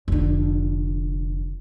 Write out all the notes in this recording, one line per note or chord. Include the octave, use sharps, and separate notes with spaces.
F1 D3